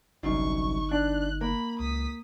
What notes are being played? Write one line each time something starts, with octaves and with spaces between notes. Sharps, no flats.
G1 C2 F#2 D#4 C#6
D4 F#6
A#3 B5
C#2 D#6 B6